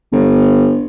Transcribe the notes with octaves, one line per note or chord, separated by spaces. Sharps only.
G1